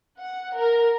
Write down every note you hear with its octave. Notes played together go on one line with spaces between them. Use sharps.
F#5
A#4